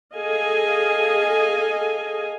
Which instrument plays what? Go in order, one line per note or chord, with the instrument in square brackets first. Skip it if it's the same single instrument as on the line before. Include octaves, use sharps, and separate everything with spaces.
[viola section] G#4 A4 D#5 F5 G#5